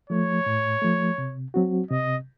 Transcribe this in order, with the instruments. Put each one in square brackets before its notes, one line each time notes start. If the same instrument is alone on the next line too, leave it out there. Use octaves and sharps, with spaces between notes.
[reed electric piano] F3 A3 [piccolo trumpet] C#5
[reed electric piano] A2
F3 A3
C3
F#3 C4 F#4
[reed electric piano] C3 [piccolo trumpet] D#5